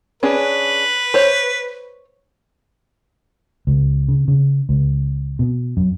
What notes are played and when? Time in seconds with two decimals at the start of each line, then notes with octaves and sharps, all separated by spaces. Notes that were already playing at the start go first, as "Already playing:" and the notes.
0.23 C#4 D4 G#4 B4
1.14 C5 C#5
3.67 C#2
4.08 C#3
4.28 C#3
4.69 C#2
5.39 B2
5.77 F#2